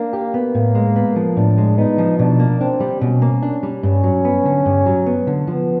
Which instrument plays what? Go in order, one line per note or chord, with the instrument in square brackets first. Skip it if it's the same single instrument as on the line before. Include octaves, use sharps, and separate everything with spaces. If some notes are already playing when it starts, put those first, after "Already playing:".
Already playing: [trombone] A#3 [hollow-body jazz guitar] D4
[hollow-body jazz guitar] G4
B3
[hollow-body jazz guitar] A2 [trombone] A#3
[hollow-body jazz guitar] G#3
B3
F3
[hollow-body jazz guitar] A2 [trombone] D4
[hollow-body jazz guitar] G#3
[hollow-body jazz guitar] B3 [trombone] D#4
[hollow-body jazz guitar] F3
[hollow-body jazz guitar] B2 [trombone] D4
[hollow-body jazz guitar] A#3
[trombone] C4 [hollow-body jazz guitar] D4
[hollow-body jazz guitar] G3
[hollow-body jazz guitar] B2 [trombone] C#4
[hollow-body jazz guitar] A#3
D4
G3
[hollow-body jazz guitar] G2 [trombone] C#4
[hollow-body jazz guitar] F#3
B3
D3
G2
F#3
B3
D3
[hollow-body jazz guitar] F3 [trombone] B3